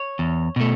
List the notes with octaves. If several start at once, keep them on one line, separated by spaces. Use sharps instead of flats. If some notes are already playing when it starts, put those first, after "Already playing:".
Already playing: C#5
E2
B2 A3